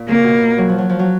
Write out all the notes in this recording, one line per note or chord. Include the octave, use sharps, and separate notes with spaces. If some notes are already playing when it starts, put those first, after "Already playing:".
Already playing: A#2
C#3 A#3
B2
F#3
F3
F#3
F3
F#3